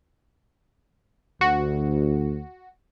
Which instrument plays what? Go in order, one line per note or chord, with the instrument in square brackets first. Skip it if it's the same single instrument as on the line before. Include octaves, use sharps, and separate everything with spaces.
[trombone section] D2 [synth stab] F#4